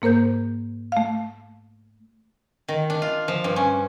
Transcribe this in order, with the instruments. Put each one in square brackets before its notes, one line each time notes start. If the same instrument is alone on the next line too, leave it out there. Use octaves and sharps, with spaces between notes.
[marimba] G#2 A#3 A#4 C5 G6
A3 F5
[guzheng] D#3
D4
F4
F3
G2
C#4